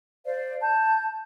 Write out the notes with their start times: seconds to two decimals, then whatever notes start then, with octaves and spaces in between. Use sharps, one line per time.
0.25 C5 D5 F5
0.60 A5 G6